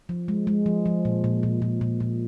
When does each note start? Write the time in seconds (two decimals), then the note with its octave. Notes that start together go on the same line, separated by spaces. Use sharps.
0.09 F3
0.28 G#3
0.47 G#3
0.66 F3
0.86 F3
1.05 A#2
1.24 A#2
1.43 A#2
1.62 A#2
1.81 A#2
2.00 A#2